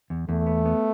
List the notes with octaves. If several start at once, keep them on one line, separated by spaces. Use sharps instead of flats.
E2
E2 A3
B3
B3